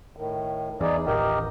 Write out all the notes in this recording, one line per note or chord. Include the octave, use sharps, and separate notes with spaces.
A2 D#3
E2 D#4 G#4 D5
D#1 A1 G4 A#4 D#5